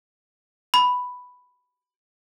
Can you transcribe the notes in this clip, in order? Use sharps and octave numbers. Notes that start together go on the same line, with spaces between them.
B5